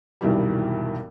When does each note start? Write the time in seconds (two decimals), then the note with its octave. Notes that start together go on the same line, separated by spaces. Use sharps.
0.21 E1 C2 G2 D#3 E3 G3